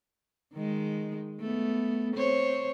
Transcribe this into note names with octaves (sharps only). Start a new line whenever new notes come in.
D#3 G#3
A3 B3
C4 C5 C#5